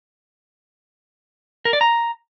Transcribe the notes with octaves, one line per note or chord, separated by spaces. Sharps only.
A#4
D5
A#5